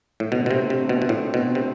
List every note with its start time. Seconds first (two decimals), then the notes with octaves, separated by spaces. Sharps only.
0.20 A2
0.31 B2 D3 A3 C4
0.46 B2
0.51 C3
0.70 C3
0.89 B2
1.02 B2
1.09 A2
1.34 B2
1.55 C3